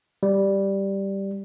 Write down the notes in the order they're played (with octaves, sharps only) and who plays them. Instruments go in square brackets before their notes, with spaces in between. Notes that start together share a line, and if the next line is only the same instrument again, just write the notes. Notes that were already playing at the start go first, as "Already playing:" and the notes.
[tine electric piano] G3